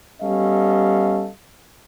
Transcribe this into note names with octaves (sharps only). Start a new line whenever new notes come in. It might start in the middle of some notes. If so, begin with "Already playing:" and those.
G3 B3 C#4 A4 D#5 F5